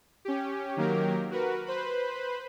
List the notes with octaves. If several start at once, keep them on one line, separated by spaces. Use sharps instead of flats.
C#4 G4
D#3 F#3 A#3 G4 A#4
F#4 A#4 B4
B4 C5 B5